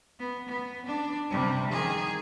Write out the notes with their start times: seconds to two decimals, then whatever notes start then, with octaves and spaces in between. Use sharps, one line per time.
0.19 B3
0.48 B3
0.86 D4
1.30 C3 G3
1.71 D#3 G#4